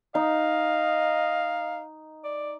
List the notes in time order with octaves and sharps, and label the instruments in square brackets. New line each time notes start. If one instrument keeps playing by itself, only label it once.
[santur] D#4 [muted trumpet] D#5 [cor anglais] F5
[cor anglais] D5